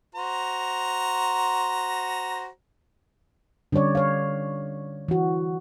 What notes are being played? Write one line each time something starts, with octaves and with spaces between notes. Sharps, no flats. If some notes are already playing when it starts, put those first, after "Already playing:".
F#4 C5 A#5
D3 G3 C#4 C#5 D5
C#5 F5
E3 F#4